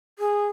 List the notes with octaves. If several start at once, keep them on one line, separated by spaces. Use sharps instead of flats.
G#4